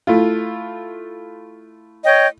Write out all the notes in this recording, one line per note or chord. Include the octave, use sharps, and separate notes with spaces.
A3 E4 F4
C#5 D#5 G5